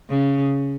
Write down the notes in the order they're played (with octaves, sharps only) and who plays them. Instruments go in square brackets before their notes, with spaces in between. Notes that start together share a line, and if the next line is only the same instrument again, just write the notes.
[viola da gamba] C#3